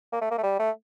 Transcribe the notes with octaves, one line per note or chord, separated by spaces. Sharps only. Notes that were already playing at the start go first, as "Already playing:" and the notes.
A#3
A3
A#3
A3
G3
A3